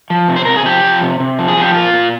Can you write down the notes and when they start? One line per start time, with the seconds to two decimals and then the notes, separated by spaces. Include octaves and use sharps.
0.10 F3
0.28 C3
0.36 C5
0.45 C3 A#4
0.56 G#4
0.65 F3 G4
0.84 F3
1.02 C3
1.20 C3
1.39 F3
1.48 G#4
1.57 F3 G4
1.74 A#2 F4
1.94 A#2